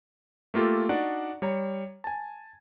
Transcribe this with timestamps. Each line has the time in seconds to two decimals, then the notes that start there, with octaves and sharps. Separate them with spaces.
0.54 A3 A#3 F4 G4 A4
0.89 D4 D#4 F#4 D5 F#5
1.42 G3 C#5 A#5
2.04 G#5 A5